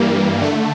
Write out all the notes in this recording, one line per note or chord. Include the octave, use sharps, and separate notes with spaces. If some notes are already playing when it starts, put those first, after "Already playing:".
Already playing: G2 E3 G3 A#3
D3 A3